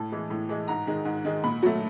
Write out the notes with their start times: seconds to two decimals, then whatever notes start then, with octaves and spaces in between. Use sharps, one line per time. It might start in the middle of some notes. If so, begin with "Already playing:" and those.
Already playing: A2 A5
0.12 E3 G#3
0.30 A2
0.49 E3 G#3
0.68 G#2 A#5
0.87 D#3 G#3
1.05 G#2
1.25 D#3 G#3
1.44 A#2 B5
1.63 F#3 A3